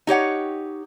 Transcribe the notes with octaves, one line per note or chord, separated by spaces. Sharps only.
D#4 G4 C#5 F#5